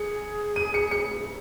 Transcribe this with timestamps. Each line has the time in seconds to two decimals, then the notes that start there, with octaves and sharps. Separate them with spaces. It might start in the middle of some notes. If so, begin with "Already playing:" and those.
Already playing: G#4 C#7
0.56 D#7
0.74 C#7
0.91 C#7